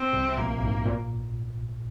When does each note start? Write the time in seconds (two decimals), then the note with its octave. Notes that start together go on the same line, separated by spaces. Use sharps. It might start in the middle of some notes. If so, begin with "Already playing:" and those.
Already playing: C4
0.13 C2 C3
0.28 C3
0.37 A#1 A#2 A#3
0.62 G#2
0.86 A#2